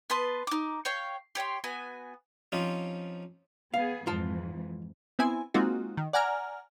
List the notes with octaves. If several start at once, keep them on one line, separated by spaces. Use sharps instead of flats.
B3 B4 A5 C6
D#4 D6
C#5 F5 G5 C#6
G4 C#5 G5 C6
B3 F#4 G#5
F3 C4 C#4 D#4 F4 G4
B3 G#4 F5
F2 G#2 E3 F4 A5
B3 C4 E4 G#5
G#3 A#3 C4 D#4 F4 F#4
D#3
D5 F#5 G#5 A#5 F6